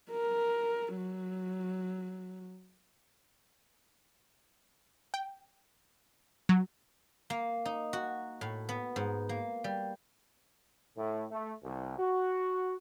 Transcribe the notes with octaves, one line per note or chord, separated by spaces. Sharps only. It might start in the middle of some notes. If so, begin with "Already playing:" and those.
A#4
F#3
G5
F#3
A#3
D#4
F#4
A2
B3
G#2
A#3
G3
A2
A3
C2
F#4